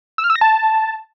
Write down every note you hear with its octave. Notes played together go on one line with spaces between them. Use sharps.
E6
F6
E6
A#6
A5